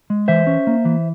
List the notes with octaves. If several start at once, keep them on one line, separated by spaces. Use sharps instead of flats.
G#3
E3 C5 E5
C#4
A#3
E3